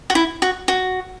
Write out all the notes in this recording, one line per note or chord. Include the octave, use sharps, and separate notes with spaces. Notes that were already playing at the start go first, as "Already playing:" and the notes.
F#4
E4
F#4
F#4